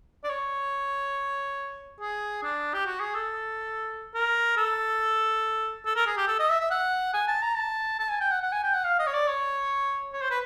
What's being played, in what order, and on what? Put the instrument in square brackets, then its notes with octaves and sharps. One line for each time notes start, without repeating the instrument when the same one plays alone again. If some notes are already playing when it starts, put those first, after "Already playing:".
[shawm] D5
C#5
G#4
D4
G4
F#4
G#4
A4
A#4
A4
A4
A#4
G#4
G4
A4
D#5
E5
E5
F#5
G#5
A5
A#5
A5
A5
G#5
G5
F#5
F#5
G#5
G5
F#5
F5
D#5
C#5
D5
C#5
C#5
C5
B4